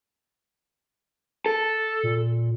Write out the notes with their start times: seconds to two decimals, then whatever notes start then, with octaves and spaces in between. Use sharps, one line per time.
1.46 A4
2.03 A#2